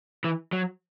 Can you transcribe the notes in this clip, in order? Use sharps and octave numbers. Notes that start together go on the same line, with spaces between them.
E3
F#3